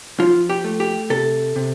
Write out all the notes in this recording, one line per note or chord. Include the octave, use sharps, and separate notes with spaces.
F3 F4
G4
A3
G4
C3 A4
C3